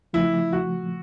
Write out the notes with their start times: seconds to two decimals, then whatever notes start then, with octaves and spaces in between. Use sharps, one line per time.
0.13 C#3 F3 A3 E4
0.53 F#4